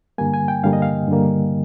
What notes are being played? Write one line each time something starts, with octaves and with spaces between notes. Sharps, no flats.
G2 D3 G3 A#3 G#5
G#5
G5
G2 D3 G3 A#3 F5
D#5
F5
G2 D3 G3 A#3